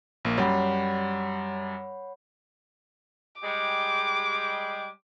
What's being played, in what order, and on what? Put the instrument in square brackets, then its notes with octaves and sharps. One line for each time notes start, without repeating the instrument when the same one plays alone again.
[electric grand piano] A#1 A#3
[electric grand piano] F#2 G3 [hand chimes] C#5 F#5 B5
[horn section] G3 G#3 G5 [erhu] D6